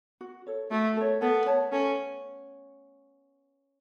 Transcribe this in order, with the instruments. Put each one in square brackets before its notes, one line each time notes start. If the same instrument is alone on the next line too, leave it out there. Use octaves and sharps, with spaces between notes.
[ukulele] F#4
A4 C#5
[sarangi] A3 [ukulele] F#4
[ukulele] A4 C#5
[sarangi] B3 [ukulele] A4
[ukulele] C#5 A5
[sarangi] C#4 [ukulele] A4